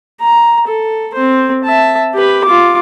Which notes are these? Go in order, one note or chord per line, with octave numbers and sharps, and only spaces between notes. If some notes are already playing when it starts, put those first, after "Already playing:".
A#5
A4
C4 C5
E5 A5
G4 B4
F4 D6